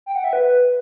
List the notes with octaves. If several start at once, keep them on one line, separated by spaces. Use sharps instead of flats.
G5
F#5
E5
B4